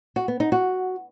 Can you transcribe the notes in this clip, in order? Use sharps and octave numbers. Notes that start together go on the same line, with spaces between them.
F#4
B3
D#4
F#4